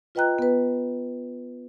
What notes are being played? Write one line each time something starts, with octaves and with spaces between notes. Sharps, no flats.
F4 B4 D#5 G5 A#5 F#6
B3 B4